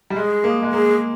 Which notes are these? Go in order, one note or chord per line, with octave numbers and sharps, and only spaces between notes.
G3
G#3 G#4
A#3
G#3
A#3 G#4